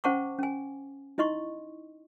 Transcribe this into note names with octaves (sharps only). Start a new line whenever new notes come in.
C#4 C5 F#5 A5 C#6 D6
C#4 G#5
D#4 E4 D#5 C6 C#6